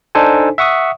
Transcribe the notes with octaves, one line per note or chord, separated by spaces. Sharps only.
D4 D#4 A4 C5 G#5
E5 F#5 C#6 D#6